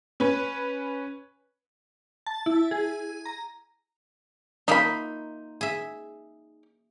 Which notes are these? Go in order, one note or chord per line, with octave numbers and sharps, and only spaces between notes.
C#4 B4
A5
E4
G#4
A#5
A#3 D#4 F4 E5 B5
G#4 E5